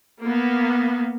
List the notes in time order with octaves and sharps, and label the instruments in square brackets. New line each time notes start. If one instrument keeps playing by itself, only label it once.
[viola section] A#3 B3